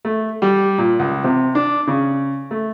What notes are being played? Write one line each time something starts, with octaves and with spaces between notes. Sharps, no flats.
A3
G3
A#2
C#2
C3
D4
C#3
A3